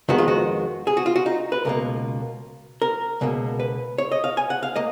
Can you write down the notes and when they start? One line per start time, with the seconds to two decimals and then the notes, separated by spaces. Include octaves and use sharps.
0.09 F2 D#3 G#3 B3 F#4
0.18 F4
0.28 F#4
0.87 G#4
0.97 F#4
1.06 F4
1.16 F#4
1.26 D#4
1.52 B4
1.65 C#2 B2 A#3 A#4
2.82 A#4
3.21 C#2 B2 A#3
3.60 B4
3.98 C#5
4.12 D#5
4.24 F5
4.37 G#5
4.50 F#5
4.63 F5
4.76 A#3 D#5